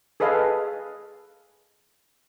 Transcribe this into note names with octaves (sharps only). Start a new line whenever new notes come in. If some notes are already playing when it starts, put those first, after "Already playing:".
G#4 A4 B4 D#5 F5 G#5